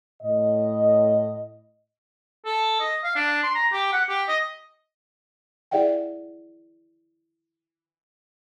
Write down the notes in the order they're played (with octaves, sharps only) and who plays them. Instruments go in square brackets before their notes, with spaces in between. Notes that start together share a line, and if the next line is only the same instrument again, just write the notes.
[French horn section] A2 D#5
[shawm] A4
D#5
F5
D4
C6
A#5
G4
F#5
G4
D#5
[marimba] E4 G#4 D5 E5 F#5 G5